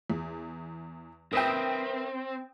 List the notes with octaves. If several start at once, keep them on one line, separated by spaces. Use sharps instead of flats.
E2
C4 A#4 B4 E5 G5 D#6